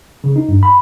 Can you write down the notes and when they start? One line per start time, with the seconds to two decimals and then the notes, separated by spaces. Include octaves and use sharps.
0.24 C#3
0.36 D#4
0.49 G2
0.63 B5